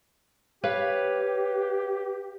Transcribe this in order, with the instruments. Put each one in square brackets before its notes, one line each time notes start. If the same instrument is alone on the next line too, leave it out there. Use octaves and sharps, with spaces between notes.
[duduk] G4 [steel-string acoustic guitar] B4 C#5 F5